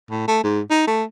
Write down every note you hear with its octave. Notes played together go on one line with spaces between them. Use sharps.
A2
A3
G#2
D#4
A3